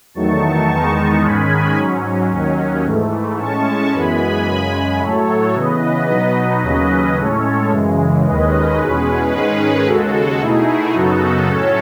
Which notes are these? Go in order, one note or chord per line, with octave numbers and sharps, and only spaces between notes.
E2 D#3 F#3 A3 D#4 A5 C#6
E2 D#3 G#3 B3 D#4
G#2 D#3 G#3 C#4 G#5 B5
G#2 F#3 C#4
D#2 D#3 F#3 C#4
G#2 E3 A3
A2 G#3 C#4 A5 C#6
F#2 E3 G#3 B3 G#5 B5
F#2 C#3 G#3
A2 F#3 A3 A4 C#5
C#3 E3 B3 B4 D#5
B2 F#3 B3 D#4
D#2 C#3 F#3 C#4 B4 D#5
A2 G#3 C#4 A4 C#5
F#2 C#3 E3 G#3
D#2 D#3 G#3 C#4 B4 D#5
E2 B2 G#3 C#4 G#4 B4
G#2 D#3 G#3 C#4 G#4 B4
D#2 C#3 G#3 F#4 A4
B2 A3 D#4 E4 G#4
F#2 C#3 F#3 B3 D#4 F#4 A4
A2 F#3 C#4 A4 C#5